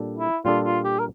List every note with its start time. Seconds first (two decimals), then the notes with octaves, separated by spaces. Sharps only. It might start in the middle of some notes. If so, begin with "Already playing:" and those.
Already playing: A#2 G3 D4 A4
0.18 E4
0.45 A#2 G3 D4 F4 A4
0.65 F4
0.84 G4
0.99 A#4